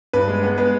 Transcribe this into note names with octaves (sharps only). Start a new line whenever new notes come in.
G2 B4
G#3
B3
G#3 B4